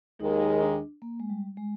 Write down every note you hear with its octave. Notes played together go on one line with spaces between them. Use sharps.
D#2 D#3 G#3 D#4
D4
A#3
G#3
G3
G#3